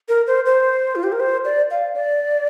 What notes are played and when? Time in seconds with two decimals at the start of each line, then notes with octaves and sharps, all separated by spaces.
0.09 A#4
0.27 C5
0.46 C5
0.96 F4
1.04 G4
1.12 A#4
1.20 C5
1.45 D5
1.71 F5
1.95 D5